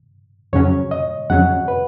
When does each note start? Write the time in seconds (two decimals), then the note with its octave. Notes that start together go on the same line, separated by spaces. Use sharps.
0.53 F2 C#3 F#3 C#4 C#5
0.91 D#5
1.30 F2 C#3 F#3 C#4 F#5
1.68 B4